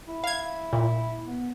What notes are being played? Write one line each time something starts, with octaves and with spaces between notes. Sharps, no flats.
E4
F5 G#6
A#2
B3